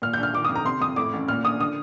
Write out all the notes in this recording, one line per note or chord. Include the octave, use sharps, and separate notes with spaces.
A#2 F6
A#1 G6
F6
D#3 D6
F2 D#6
A#5
C3 C6
F2 D#6
A2 D6
A1
A#2 F6
A#1 D#6
D3 D#6